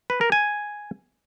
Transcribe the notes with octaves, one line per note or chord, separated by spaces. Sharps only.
B4
A#4
G#5